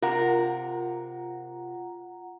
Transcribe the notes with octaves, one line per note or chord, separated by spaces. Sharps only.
C3 F4 A#4 F#5 A#5